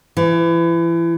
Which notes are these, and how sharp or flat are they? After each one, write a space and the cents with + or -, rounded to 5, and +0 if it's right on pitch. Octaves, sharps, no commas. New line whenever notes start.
E3 +30